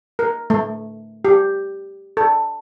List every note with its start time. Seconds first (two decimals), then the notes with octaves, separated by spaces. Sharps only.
0.19 A#4
0.50 A3
1.25 G4
2.17 A4